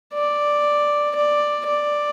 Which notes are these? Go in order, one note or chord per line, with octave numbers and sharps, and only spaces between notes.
D5
D5
D5